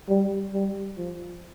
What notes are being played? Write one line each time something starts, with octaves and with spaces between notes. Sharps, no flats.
G3
G3
F3